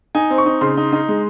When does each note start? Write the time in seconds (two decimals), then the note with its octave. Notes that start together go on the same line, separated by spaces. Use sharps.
0.15 D#4 G#5
0.30 C4
0.38 C#6
0.46 D#4
0.61 C#3 C6
0.77 D#4
0.93 D#4
1.09 G#3